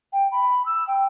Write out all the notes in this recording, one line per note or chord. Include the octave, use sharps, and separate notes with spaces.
G5
B5
E6
G5